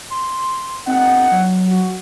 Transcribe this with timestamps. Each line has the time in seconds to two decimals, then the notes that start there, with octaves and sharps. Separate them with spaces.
0.10 C6
0.87 G1 C4 D#4 F#5
1.31 F#3
1.68 F#4